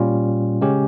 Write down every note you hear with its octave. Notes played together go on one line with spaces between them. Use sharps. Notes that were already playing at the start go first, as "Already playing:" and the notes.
Already playing: A#2 G3 C#4 F4
C#3 G#3 C#4 G4